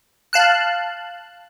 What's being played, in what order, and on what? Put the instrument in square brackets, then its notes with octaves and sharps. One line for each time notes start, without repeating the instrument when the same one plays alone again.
[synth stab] F5 A5 F#6